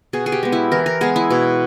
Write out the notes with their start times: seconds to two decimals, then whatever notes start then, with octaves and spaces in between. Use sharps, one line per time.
0.13 B2 G#4
0.26 G#4
0.32 G4
0.43 G#3 B3
0.52 E4
0.72 E3 A#4
0.86 A#4
1.01 G#3 B3 G#4
1.16 E4
1.30 B2